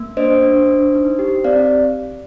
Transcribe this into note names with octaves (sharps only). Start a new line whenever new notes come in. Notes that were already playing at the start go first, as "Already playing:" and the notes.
Already playing: A#3
D4 C5 D#5
D4
D4
D#4
G4
C4 D5 F5